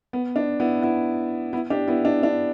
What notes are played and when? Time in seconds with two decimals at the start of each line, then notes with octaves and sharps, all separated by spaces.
0.13 B3
0.36 D4
0.60 B3 E4
0.82 B3 E4
1.53 B3 E4
1.70 D4 G4
1.88 B3 E4
2.05 D4
2.23 D4